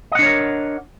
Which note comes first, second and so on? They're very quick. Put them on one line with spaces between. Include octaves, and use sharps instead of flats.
D#5 F#5 D4 C#5 A#4